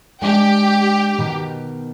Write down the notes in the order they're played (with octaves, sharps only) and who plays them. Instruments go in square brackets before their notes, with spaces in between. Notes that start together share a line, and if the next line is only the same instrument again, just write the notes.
[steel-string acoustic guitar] G#3 D4 G5 [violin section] G4
[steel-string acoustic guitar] B2 D#3